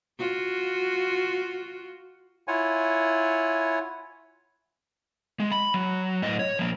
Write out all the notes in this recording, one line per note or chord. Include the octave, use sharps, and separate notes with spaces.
F4 F#4
E4 F4 C#5 F#5 G#5
G#3
B5
F#3
A2 D#5
C#5
F3 A#3